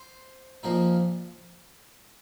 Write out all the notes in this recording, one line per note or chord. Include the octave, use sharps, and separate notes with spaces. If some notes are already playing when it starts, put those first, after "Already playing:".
Already playing: C5
A#2 F3 A#3 D#4